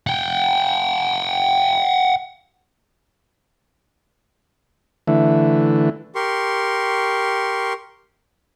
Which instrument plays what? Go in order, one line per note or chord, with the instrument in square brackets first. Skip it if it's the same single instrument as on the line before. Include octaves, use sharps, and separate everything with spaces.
[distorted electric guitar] F#5 G5
[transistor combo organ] D3 E3 A3
[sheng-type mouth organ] G4 A#4 C6 C#6